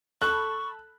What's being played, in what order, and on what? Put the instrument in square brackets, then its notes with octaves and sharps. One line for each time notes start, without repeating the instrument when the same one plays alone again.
[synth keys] A4 A5 B5 [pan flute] C#6 [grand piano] F#6